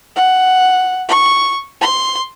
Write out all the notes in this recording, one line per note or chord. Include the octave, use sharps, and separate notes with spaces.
F#5
C#6
C6